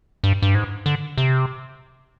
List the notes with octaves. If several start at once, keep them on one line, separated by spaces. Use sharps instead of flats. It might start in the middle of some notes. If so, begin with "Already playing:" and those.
G2
G2
G#2
D3
C3